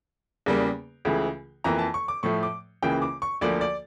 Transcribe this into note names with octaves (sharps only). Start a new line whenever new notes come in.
E2 C#3 G3 A#3
C#2 C#3 E3 A3
F2 E3 A#3 A#5
A5
C#6
D6
A2 F3 A3 C#6
D6
C#2 C#3 E3 A#3 G5
D6
C#6
D2 D3 F3 A#3 D5
D5